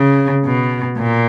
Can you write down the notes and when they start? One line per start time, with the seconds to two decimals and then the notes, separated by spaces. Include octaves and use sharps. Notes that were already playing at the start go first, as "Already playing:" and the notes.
Already playing: C#3
0.45 B2
0.98 A#2